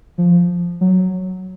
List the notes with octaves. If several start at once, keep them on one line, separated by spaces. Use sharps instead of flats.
F3
F#3